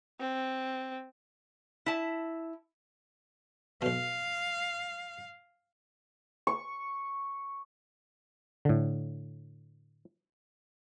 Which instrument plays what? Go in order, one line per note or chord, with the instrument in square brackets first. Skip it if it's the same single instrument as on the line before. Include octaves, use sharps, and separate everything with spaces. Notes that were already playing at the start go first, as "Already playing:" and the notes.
[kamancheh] C4
[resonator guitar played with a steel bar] E4 A5
[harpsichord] B1 B2 [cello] F5
[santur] C#6
[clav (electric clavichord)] A2 D3